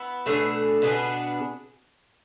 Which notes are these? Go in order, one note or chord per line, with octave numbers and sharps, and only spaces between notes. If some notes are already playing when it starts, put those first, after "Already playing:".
Already playing: B3 E4
B2 A3 D4 G#4
B2 B3 D4 G#4